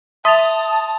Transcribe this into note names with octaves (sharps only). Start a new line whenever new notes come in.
E5 A5 C6 D#6 A6 F7